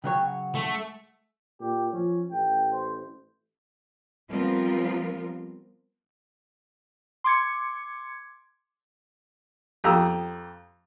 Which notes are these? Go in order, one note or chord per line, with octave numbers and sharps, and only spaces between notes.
C#3 F#3 C#5 G5
F#5
A3
A#2 G4
F3 C#4
A1 G5
C5
F3 G3 B3 C4 F4 A#4
C6 D6 G#6 C#7
F2 G4 A#5 D#6 E6